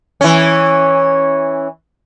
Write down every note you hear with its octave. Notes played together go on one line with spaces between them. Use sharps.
E3 C#4